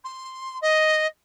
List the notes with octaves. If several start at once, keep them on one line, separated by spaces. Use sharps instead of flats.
C6
D#5